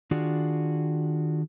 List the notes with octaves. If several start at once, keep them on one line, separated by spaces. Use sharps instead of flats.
D#3 D4 F4 F#4 G#4 D5